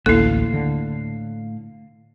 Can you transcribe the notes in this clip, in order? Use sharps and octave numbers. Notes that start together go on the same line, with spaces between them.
A1 D2 A2 A#3 E4 A4 F5
D3